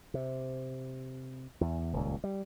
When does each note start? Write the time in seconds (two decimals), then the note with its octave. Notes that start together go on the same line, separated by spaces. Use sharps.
0.14 C3
1.61 E2
1.93 D#1 C#2
2.24 G3